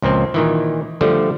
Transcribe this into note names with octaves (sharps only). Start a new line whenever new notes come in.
C#2 A#2 F3 C4
A#2 D#3 E3
D3 F3 G3 A3